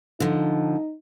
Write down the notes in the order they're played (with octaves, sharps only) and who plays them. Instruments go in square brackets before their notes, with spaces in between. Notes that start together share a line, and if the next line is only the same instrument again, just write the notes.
[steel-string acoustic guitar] D3 F3 [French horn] D#4